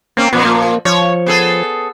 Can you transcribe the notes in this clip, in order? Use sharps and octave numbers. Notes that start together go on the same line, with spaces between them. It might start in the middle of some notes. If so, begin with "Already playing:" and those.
A#3 C4 C#4
A#2 F3 B3
A#3
F3 C#5
B3 G#4 A4